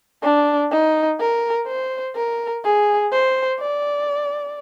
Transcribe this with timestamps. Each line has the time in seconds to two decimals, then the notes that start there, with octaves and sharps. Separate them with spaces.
0.23 D4
0.72 D#4
1.19 A#4
1.67 C5
2.16 A#4
2.64 G#4
3.12 C5
3.60 D5